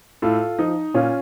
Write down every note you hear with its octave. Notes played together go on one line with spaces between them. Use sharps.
A2 F4 A4
F3 D#4
A#2 C#4 F4